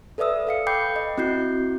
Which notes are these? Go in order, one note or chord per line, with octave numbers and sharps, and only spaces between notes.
A4 B4 D5 E5 D#6 E6
A4 F5 C#7
G5 B5 D6 G6 C7 C#7
D#5
C4 E4 F#4 G6 C7